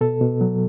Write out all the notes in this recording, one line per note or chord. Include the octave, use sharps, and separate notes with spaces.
B2 A4
B2
F#3